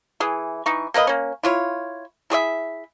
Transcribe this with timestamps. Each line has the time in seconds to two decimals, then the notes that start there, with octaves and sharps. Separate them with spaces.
0.20 E3 G#4
0.66 E3 D#4 C#6
0.94 A#3 A#4 B4 D#5
1.07 A#3 C#4
1.43 E4 F4 C#5
2.30 E4 G#4 C#5 E5